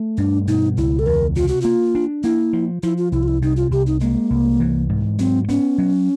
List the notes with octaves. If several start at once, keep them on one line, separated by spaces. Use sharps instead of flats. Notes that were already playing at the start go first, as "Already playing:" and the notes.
Already playing: A3
G2 D4
B2 D#4
C#2 E4
A4
E2 A#4
C3 F4
F#4
A#3 F4
D4
A#3 E4
F3
F3 E4
F4
C2 E4
F4
E4
C3 D#4
F4
C2 G4
D#4
G#3 A#3
C2
E3
G#2
F#3 C4
B3 C#4
F#3